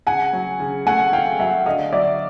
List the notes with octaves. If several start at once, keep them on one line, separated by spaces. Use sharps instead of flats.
C#3 F#5 G#5
F#3
C#3
A3 F#5 G#5
C#3 F5 G5
F#3 E5 F#5
D3 D#5 F5
F#3 D5 E5